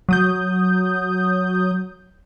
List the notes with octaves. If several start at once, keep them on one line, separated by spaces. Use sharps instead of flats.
F#3 D#6 G6